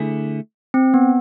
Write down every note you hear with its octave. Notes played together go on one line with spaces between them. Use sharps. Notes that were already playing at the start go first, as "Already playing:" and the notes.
Already playing: D3 A3 E4 G#4
C4
B3